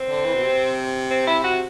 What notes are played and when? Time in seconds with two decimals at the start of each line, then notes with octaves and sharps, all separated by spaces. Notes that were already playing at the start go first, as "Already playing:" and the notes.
Already playing: C4
0.08 D3
0.25 E3
0.34 B2
0.43 C3
1.10 C4
1.27 E4
1.44 F#4